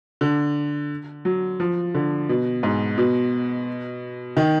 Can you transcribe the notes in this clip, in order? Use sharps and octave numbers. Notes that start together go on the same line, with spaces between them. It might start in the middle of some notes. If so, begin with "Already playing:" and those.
D3
F#3
F3
D3
B2
G#2
B2
D#3